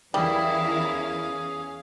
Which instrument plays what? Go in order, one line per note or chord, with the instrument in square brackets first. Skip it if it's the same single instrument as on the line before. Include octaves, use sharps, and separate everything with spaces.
[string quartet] E2 C#4 F5 [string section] E3 E4 A#4 [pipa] G3 [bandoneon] G#4